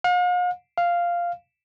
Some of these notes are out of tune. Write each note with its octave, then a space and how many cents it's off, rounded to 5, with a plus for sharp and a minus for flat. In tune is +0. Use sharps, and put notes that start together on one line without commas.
F5 +45
F5 -5